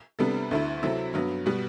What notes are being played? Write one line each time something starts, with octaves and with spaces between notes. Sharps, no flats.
C3 G3 B3 D4 A4
D2 D3 A3 E4
C3 F#3 C4 E4 A4
G2 F#3 B3
B2 G3 B3 F#4